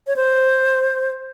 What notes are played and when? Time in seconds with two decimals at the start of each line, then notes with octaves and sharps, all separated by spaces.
0.07 C#5
0.16 C5